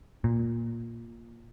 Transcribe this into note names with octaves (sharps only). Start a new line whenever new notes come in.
A#2